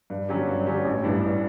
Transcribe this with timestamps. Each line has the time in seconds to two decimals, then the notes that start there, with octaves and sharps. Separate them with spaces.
0.10 G2
0.29 D3 F#3 C#4 G4
0.48 G2
0.67 D3 F#3 C#4 G4
0.85 A1
1.04 G2 E3 G3 D4
1.23 A1